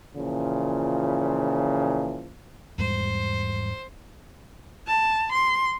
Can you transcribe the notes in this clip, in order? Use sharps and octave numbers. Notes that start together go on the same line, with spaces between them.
A#2 C#3 E3 F3
E2 G#2 G3 C5
A5
C6